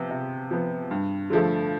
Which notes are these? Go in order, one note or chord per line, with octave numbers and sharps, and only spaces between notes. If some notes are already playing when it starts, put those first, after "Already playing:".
Already playing: C3 F3 B3
C3
F3 B3
G2
D3 F3 A3